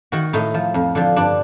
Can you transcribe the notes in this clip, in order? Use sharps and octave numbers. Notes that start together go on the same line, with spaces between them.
D#3 F#4
A2 D#4
F3
F2
D3 F3
G2 D4